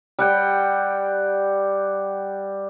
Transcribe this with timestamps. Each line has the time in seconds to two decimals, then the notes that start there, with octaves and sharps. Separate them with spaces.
0.19 G3 F#5 G5